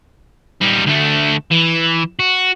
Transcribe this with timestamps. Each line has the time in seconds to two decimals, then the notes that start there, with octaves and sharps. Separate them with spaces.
0.61 G3 D#4
0.87 D2 A3
1.51 E3
2.19 F#4